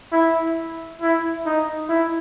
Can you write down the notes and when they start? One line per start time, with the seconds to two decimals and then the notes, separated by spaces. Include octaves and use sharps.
0.12 E4
1.01 E4
1.46 D#4
1.89 E4